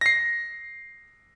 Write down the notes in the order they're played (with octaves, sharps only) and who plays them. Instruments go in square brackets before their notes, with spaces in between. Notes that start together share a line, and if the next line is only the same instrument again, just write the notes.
[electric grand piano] A#6 C7